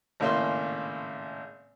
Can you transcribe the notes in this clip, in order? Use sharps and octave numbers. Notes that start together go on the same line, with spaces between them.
G#1 A2 C#3 A#3 E5 C6